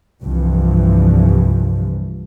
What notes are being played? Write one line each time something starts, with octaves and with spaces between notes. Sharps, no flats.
C2 G2 E3 F3